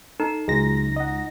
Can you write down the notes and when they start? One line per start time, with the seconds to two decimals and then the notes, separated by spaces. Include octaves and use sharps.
0.20 D#4 A4
0.48 C#2 F#3 G#3 A#6
0.96 D#5 F#5